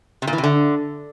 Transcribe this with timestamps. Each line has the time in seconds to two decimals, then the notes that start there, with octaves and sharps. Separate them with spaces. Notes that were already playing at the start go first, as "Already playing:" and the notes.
0.22 C3
0.27 A#2
0.33 E3
0.38 C3
0.44 D3